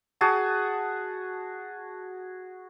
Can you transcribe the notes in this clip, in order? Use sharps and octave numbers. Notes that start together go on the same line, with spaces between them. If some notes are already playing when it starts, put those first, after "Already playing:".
F#4 G#4 A5 D#6